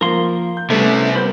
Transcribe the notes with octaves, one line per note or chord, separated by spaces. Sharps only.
F3 A#3 A#4 C6
G6
C3 G3 A3 B3 C#4 E5
B3 A#4 C5 B5 G6